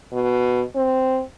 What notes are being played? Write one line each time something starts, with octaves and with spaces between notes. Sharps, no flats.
B2
C4